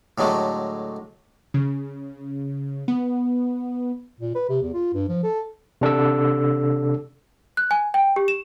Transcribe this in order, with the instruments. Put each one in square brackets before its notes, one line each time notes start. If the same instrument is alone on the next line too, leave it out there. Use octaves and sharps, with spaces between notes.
[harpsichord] A2 D3 F#3 G#3 A3
[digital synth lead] C#3
B3
[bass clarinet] A#2
B4
C3
E2
F4
G2
F3
A4
[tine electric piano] C3 D4 A4 E6
[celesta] F#6
G#5
G5
G4
E7